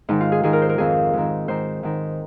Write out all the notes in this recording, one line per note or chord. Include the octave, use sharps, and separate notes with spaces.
G#2 D#3 D#4
F4
G#4
G#2 D#3 G#4
A#4
C5
A#4
F2 D#3 G#4
G#2 D#3
G#2 D#3 C5
G#2 D#3